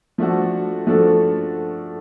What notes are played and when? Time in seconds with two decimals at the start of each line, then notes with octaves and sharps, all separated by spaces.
0.18 F3 A3 D4 F#4 A4
0.87 F3 A3 D4 F#4 A4